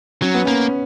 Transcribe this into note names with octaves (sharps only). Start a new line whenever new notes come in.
F#3 C#4
B3
A#3 C#4